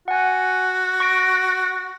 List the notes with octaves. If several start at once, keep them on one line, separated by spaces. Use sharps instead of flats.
F#4 F#5 G#5
C#6 A#6 D7